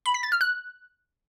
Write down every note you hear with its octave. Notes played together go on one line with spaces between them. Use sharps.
B5
B6
A6
F6
F#6